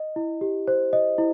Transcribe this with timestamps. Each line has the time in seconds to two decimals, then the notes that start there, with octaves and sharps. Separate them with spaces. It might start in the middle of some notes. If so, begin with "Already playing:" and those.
Already playing: D#5
0.16 E4
0.41 G4
0.68 C5
0.93 D#5
1.18 E4